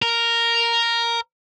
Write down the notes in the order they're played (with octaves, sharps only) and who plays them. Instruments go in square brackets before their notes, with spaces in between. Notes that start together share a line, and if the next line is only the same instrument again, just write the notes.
[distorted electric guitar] A#4